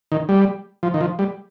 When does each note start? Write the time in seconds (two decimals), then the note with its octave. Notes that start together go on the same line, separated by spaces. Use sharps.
0.12 D#3
0.29 G3
0.83 F3
0.94 D#3
1.01 F3
1.19 G3